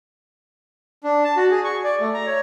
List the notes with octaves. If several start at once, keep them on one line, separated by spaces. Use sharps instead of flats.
D4
A5
F#4
G#4
C#6
D5
A3
A#5
C#5